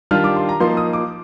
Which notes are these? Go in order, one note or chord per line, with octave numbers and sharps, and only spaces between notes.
D#3 G3 D4 F4 F6
D6
C6
A#5
F3 A#3 D#4 C6
D#6
D6